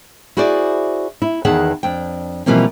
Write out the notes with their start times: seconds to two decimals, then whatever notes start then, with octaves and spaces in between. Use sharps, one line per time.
0.37 E4 F#4 G#4 C5 D5
1.22 E4
1.45 E2 D#3 G#4 B4 F#5 A5
1.83 F2 D4 G5
2.46 B2 E3 F3 G3 A#3 C4